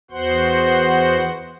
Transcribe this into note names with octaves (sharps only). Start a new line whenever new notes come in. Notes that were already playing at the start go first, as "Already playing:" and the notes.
E2 B3 F#4 C5 F#5 C6